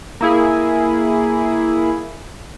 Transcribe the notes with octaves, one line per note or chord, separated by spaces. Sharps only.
A#3 E4 G#4